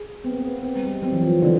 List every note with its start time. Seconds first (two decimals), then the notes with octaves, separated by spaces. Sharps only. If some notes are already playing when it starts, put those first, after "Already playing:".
Already playing: G#4
0.24 B3 C4
0.32 A#3
0.39 B3
0.63 C4
0.76 G#3
0.84 G3
1.02 F#3 C4
1.13 E3
1.22 F3
1.42 D3 E3